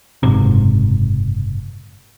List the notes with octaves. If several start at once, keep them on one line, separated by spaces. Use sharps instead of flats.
F#1 G#2 C3